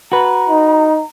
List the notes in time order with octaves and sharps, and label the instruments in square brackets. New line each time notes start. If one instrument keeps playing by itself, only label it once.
[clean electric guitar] F#4 B4 [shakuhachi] A#5
[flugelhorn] D#4